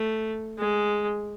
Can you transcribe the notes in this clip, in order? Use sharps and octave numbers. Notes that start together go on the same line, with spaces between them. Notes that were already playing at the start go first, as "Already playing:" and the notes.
Already playing: A3
G#3